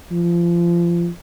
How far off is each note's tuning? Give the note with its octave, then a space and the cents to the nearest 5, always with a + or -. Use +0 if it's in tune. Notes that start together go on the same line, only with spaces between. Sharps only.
F3 -25